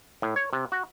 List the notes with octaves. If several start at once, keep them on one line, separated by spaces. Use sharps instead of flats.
A2
C#5
C3
F#4